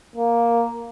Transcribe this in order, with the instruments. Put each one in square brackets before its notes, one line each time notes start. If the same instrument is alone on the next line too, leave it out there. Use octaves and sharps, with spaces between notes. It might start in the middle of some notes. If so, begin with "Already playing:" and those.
[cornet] A#3